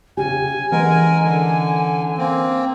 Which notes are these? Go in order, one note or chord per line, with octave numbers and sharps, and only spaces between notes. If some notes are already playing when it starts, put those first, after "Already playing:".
C#3 G4 G#5
E3 G#3 C#4 A#4 F#5
D3
A#3 C4